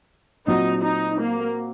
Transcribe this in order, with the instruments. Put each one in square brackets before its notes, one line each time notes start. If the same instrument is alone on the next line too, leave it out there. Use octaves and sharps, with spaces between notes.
[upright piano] A#2 F#3 C4 F#4 [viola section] D#4
[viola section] D#4
A#3